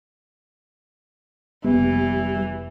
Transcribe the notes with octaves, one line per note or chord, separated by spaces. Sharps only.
F1 E3 G3 A#3 B3